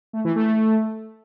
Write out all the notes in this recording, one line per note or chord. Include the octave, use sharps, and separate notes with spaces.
A3
E3
A3